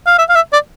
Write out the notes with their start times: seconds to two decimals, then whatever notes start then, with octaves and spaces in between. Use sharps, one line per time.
0.07 F5
0.19 E5
0.29 F5
0.35 E5
0.53 D5